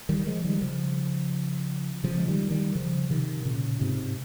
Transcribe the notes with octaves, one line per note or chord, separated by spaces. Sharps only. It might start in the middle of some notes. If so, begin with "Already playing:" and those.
D#3 G3
F3 G#3
D#3 G3
C#3 F3
C#3 F3
G#3
D#3 G3
D#3 G3
C#3 F3
C3 D#3
A#2 C#3
G#2 C3